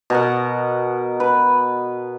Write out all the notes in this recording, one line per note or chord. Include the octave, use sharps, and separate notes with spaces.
B2 A#4 F#5
B4